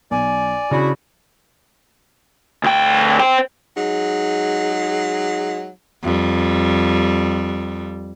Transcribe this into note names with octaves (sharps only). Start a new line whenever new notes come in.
B1 D5 G#5
C#3 D4 E4 F#4
D2 G5
C5 G5
F#3 G#3 D#4 G#4
F2 G3